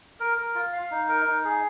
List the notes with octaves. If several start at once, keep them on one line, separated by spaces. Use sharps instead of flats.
A#4
A#4
F4
F5
D#4
A#4
D#4
G#4